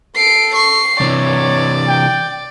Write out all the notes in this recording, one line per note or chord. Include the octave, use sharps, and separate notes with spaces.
A4 C7 D7
C#6 C7
C3 E3 C#5 D5
G5